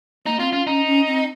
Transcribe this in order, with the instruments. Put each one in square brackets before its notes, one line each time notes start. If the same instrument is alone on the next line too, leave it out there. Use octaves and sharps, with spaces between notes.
[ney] A#3 [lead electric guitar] D#4
[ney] C4 [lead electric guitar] F4
[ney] C#4 [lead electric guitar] F4
[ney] C#4 [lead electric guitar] D#4
[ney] C#4
C4